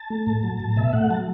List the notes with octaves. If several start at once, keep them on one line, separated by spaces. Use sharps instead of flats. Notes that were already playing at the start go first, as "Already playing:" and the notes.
Already playing: A5
A3
A2
F#3
A2
B2 E5
A3 F#5
F#3 A5